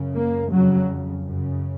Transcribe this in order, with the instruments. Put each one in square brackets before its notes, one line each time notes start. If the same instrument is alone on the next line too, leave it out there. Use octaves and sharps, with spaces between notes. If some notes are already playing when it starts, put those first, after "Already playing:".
Already playing: [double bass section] F#2 C#3
A#3
F2 C#3 F#3
F#2 C#3